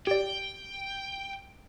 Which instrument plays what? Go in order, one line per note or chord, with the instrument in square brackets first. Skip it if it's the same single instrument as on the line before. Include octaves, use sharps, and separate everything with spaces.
[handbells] G4 D5 [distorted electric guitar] G5